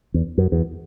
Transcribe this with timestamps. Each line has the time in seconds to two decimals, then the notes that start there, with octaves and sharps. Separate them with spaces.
0.14 E2
0.38 F#2
0.52 E2